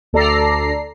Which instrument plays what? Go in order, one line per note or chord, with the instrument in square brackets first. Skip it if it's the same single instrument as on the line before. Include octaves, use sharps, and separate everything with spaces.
[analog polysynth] D2 A4 D5 A#5 C7